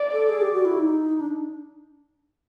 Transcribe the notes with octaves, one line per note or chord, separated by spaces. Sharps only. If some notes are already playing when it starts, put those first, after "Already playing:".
Already playing: D5
A4
G#4
G4
F#4
E4
D#4
D4